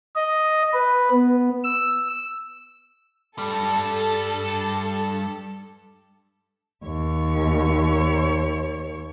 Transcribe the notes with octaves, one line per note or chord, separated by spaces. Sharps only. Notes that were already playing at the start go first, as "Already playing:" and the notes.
D#5
B4
B3
E6
G2 G3 A4
D#2 C#5